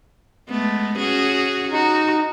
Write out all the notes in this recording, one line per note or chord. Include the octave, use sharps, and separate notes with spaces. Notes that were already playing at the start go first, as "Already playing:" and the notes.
G#3 A3 B3
C#4 F#4 G#4
D#4 F#4